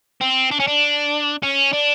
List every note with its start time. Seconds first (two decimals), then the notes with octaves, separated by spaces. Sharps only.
0.21 C4
0.52 D4
0.60 C#4
0.67 D4
1.43 C#4
1.73 D4